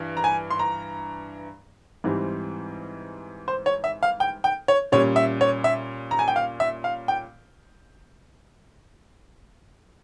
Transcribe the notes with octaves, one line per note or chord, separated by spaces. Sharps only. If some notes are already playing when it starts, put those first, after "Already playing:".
Already playing: G2 E3
A#5
G#5
C6
A#5
G#2 E3 G3 C4
C5
C#5
E5
F5
G5
G5
C#5
A#2 G3 C#4 C#5
E5
C#5
E5
A#5
G#5
G5
F5
E5
F5
G5